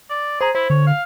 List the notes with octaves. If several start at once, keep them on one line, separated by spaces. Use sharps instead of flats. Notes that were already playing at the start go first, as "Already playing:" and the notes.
D5
G#4 C5 A#5
E4 C5
D3 C#5
F5